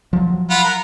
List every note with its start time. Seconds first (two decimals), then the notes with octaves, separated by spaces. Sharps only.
0.13 F3 F#3
0.50 F4 F#5 B5
0.64 A#4